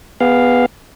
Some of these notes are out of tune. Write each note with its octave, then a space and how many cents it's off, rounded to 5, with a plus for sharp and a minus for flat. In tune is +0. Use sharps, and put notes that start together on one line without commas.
B3 +0 G#4 -35 F5 +0